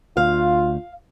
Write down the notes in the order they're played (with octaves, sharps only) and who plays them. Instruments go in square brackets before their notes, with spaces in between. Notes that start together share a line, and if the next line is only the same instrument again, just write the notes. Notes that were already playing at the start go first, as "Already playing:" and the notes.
[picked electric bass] D2 [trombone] F4 [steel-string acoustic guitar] F5